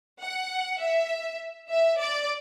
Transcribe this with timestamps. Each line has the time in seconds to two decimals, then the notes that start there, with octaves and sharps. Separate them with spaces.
0.19 F#5
0.79 E5
1.69 E5
1.99 D5